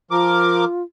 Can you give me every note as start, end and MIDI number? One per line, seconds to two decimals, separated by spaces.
0.11 0.65 53
0.11 0.83 65
0.11 0.65 70
0.11 0.65 86